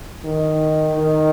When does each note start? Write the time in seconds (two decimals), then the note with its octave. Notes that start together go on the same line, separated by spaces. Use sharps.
0.24 D#3
0.95 D#3